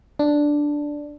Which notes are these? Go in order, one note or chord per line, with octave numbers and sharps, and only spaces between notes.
D4